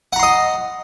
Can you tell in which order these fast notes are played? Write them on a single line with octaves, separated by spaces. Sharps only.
F#5 A#5 C6 D#5